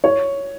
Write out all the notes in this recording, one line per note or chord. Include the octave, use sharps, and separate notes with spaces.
C#5